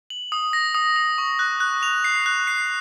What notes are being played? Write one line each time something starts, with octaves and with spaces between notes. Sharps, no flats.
F#7
D#6
A#6
D#6
D#6
C#6
F#6
F#6
F7
C7
F#6
C7